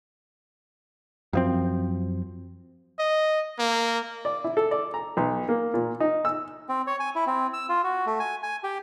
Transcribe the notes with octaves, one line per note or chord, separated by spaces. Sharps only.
F#2 F3 C4
D#5
A#3
D5
E4
A4
D5
A#5
B1
A#3
A#2
D#4
E6
C4
C#5
G#5
E4
C4
E6
F4
F#4
A3
G#5
G#5
G4